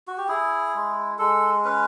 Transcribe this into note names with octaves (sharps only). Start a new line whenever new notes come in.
F#4
G4
E4 G#4
G#3
G#3 A4
C#4 B4